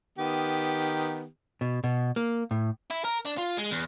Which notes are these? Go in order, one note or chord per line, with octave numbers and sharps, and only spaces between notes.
D#3 B3 G4
B2
B2
A#3
A2
E4
A#4
D4
F4
G#3
E2